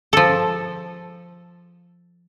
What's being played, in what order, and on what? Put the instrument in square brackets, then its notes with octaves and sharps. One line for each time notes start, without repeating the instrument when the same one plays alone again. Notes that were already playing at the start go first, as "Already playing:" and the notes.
[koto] F3 A4